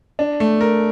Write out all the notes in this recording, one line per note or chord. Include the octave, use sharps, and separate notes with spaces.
D4
A3
A#4